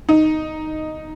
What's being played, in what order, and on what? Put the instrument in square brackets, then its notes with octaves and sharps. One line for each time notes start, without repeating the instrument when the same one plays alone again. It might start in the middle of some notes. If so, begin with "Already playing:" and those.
[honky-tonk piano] D#4